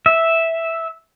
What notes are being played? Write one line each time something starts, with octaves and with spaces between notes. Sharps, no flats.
E5